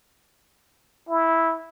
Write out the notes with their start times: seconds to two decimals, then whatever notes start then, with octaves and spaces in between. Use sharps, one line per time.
1.09 E4